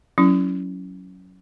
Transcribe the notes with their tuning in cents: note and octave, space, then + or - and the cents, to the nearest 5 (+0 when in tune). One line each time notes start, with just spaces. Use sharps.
F#3 +0 C#4 +0 E4 +0